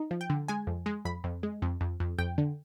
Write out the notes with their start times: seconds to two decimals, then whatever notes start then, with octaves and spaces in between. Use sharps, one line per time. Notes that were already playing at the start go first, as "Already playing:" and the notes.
Already playing: D#4
0.11 F3
0.21 G5
0.30 D3
0.48 G#3 G#5
0.67 F2
0.86 G#3
1.05 F2 B5
1.24 F2
1.43 G#3
1.62 F2
1.81 F2
2.00 F2
2.19 F2 G5
2.38 D3